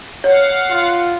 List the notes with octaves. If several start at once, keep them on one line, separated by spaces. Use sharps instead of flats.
C#5 F5 F#5
F4